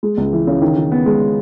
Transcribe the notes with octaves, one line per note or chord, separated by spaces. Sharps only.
G#3
C#2
E3
C#3
D#3
D#3
B3
G#3